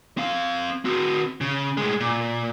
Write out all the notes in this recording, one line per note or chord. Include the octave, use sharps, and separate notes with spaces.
C4 F5
C4 F#4
C#3
A2 G#3
A#2